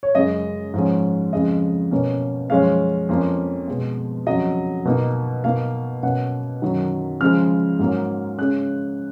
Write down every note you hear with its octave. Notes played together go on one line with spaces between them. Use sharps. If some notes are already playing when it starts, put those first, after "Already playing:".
C#5
F#2 C#3 G#3 D#5
G#2 F3 G#3 C#4
F2 C#3 G#3 D#5
B2 A#3 C#4
F#2 F3 G#3 C#4 F5
F2 F3 A#3 C#4
B2 G#3 B3
F2 C#3 F#3 D#5
B2 A#3 D#4
B2 A#3 D#4 F5
B2 A#3 C#4 F#5
F#2 D#3 F#3
C#3 F3 G#3 F6
G#2 F#3 A#3 C#4
C#3 G#3 C#4 F#6